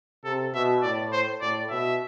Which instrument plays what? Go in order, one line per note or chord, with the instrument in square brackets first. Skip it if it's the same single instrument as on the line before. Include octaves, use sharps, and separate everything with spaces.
[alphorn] C3 [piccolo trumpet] A4
[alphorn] B2 [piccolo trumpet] E5
[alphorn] A2 [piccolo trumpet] D5
[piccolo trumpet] C5
[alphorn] A2 [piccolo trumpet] D5
[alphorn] B2 [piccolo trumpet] E5